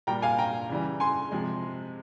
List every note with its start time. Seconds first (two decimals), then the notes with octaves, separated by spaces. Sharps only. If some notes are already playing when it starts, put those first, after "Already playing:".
0.07 A#2 G3 G5 A#5
0.22 F5 G#5
0.38 G5 A#5
0.69 C#3 E3 G3
1.00 G#5 C6
1.32 C3 F3 G#3